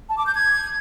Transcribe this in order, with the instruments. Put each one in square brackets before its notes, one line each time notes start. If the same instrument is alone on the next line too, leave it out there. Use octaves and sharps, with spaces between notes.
[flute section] A5
D6
G6
G#6